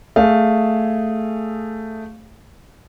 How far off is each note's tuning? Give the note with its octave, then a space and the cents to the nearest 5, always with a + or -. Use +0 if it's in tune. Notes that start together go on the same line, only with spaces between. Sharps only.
A3 +5 G#4 +5 F5 +0